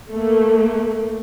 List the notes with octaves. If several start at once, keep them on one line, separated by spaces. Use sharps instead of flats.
A3 A#3